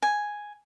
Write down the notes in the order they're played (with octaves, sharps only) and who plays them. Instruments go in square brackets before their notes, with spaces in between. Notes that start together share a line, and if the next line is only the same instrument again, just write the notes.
[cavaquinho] G#5